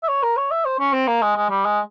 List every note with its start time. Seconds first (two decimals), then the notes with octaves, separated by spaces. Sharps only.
0.03 E5
0.08 C#5
0.23 A#4
0.37 C#5
0.51 E5
0.65 C5
0.79 C#4
0.93 C4
1.07 A#3
1.22 G#3
1.36 G#3
1.50 G3
1.65 G#3